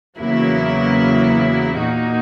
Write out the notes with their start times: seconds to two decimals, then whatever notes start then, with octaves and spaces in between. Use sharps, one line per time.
0.18 E2 C#3 F#3 A#3 E4
1.78 A#2 A#3 D#4 F#4